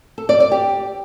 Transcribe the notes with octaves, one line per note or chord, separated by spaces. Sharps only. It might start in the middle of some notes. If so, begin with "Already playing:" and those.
A4
D5
D5
G4